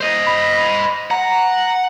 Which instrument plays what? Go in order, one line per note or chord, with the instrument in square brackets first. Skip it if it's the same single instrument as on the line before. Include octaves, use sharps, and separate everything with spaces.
[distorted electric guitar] C5 D#5
[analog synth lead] B5
[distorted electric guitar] F#5 [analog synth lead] A#5